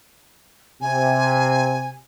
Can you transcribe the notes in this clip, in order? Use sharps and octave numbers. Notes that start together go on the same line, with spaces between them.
C3 G#5